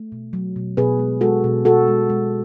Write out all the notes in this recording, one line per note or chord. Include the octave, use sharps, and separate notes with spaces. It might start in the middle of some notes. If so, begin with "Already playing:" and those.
Already playing: A3
B2
F#3
B2
B2 G#4 B4
G#3
G#3 F#4 A4
B2
B2 F#4 A4
G#3
G#3